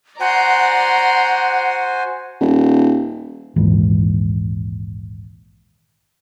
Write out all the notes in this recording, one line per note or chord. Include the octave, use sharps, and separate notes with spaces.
F#4 C5 D5 F#5 G#5 A#5 C6
D#1
A#1 D#2 G#2 E3